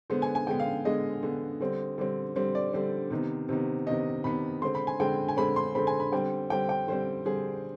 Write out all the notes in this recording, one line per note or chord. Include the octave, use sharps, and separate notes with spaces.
D3 G#3 B3 C5
G#5
G#5
D3 G#3 B3 G5
F5
D3 G#3 B3 D#5
D3 G#3 B3
D3 G3 C4
D3 G3 C4
D3 G3 C4
D5
D3 G3 C4 C5
C3 D#3 B3
C3 D#3 B3
C3 D#3 B3 D#5
C3 D#3 B3 B5
D3 G#3 C4 C6
B5
G#5
D3 G#3 C4 G5
G#5
D3 G#3 C4 B5
C6
D3 G#3 C4 B5
G#5
B5
D3 G3 C4 G5
D3 G3 C4 G5
G5
D3 G3 C4 C5
D3 G3 C4 G#4